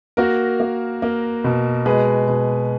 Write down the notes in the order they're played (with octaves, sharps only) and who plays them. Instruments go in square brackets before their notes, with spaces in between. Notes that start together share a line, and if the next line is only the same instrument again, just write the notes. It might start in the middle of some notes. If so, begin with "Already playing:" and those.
[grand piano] A#3 F#4 A#4
A#3
A#3
B2
G#3 G#4 B4
B2